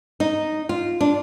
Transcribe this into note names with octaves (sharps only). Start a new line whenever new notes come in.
D#4
F4
D4